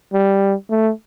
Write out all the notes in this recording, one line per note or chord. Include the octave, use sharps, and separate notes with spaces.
G3
A3